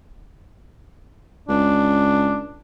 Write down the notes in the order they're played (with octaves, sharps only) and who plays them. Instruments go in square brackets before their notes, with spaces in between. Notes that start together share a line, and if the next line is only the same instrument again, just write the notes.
[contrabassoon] C#2 [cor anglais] D4